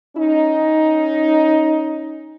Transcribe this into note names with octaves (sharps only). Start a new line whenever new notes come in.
C#4 D#4